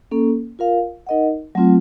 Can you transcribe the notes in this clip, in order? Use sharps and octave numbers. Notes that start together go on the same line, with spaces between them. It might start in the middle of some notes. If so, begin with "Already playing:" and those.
A#3 C#4 A4
F4 A#4 F5
D#4 A#4 D#5 F#5
F#3 A3 C4 F4